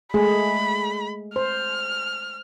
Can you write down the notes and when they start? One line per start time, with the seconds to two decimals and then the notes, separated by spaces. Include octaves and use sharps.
0.14 G#3 A3 G#4 B5
1.36 C5 F6